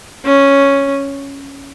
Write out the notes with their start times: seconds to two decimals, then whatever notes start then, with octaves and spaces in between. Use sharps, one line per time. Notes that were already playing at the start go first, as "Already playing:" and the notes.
0.25 C#4